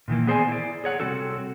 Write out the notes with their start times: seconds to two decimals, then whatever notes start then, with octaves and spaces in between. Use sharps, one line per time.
0.08 A#2 D#3 E3 A#3
0.27 B3 G#4 C5 D5 F#5 G#5
0.48 E4 D5
0.84 G#4 C#5 F#5
1.00 C3 D#3 G3 C4 F#4 A4